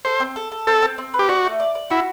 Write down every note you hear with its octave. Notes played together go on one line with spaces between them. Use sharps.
A4 C5
C4
A4
A4
C4 A4
C4
C4
B4
G4
F#4 D5
A3
D5
D5
E4 F#4